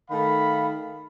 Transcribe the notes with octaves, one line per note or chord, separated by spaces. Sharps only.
D#3 A3 F5 B5